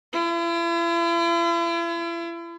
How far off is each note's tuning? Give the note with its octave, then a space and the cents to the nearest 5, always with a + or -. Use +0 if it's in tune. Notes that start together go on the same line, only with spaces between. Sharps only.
E4 +45